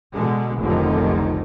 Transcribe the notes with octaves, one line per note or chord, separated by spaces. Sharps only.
B2 D3 G#3
F1 B1 F2 D3 D#3